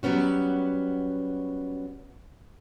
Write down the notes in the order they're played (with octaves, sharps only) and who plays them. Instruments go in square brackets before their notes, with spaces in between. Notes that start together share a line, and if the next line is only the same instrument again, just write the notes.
[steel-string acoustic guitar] F#3 G3 B3 C#4 F#4